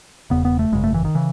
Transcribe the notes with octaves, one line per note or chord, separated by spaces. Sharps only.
E1 E2 C#3 B3
B3
A3
G#1 F#2 C#3 G#3
A3
E3
D#3
C#3 E3